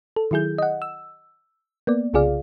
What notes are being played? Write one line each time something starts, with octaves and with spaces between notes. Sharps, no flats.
A4
D#3 F#3 E4 G#4 G6
D#5 F#5
E6
A#3 B3 D5
C2 C#3 F4 G#4 D5 F5